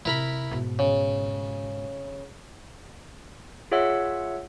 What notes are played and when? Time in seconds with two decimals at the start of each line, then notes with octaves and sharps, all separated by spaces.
0.05 C3 E4 A#4 B5
0.51 G#2 B2
0.79 C#3
3.71 F4 G#4 C#5 E5 F#5 E6